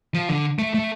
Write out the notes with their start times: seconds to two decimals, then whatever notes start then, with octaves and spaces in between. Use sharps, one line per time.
0.14 F3
0.29 D3
0.59 A3
0.74 A3